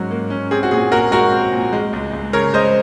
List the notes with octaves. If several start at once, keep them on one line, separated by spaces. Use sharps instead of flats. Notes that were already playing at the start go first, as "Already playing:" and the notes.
Already playing: G#2 F#3 A#3 C#4 F#4
A#3
C#4
C4 G#4
F#4
A#2 G#4
A#2 F#4 A#4
G#3 F#4 A#4
C4
A#2
G#3
C#2
C#2
C#3 A#4 C#5
G#3 C5 D#5